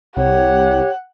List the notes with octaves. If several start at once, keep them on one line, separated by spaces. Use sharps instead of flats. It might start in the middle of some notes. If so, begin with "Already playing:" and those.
C2 G4 C#5 F#5